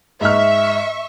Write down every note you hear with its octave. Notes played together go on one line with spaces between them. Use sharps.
G#2 E5 C#6 F6